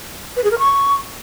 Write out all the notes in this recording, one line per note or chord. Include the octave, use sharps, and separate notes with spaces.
B4
G#4
A#4
C#6